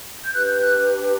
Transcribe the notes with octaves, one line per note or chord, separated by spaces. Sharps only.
G6
D4 G4 B4 F#6
G6
F#6